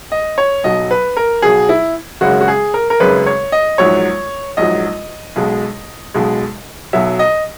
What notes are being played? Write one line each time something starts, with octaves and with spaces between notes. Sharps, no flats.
D#5
C#5
B1 B2 F#3 D#5
B4
A#4
B1 B2 F#3 G#4
E4
G#1 F#2 C#3 G#3 F#4
F#4
G#4
A#4
A#4
G#1 F#2 C#3 G#3 B4
C#5
D#5
A#1 G#2 F#3 C#5
A#1 G#2 F#3 D#5
B1 B2 G#3
B1 B2 G#3
B1 B2 F#3 E5
D#5